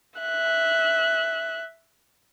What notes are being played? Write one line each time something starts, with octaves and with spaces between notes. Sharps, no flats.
E5 F#6